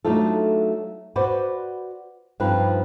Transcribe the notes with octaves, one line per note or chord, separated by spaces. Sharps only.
F#3 A3 D4 D#4 F4 A4
F#4 B4 C5 D5
G2 F3 C4 D#4 B4